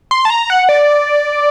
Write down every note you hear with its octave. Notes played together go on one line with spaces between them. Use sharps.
C6
A5
A#5
F#5
D5